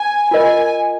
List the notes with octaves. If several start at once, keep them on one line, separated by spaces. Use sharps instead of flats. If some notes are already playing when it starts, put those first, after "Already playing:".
Already playing: G#5
F4 A#4 D#5 G#5